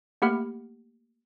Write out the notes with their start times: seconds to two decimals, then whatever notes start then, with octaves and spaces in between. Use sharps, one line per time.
0.22 A3 A#3 G4 F#5 B5 F6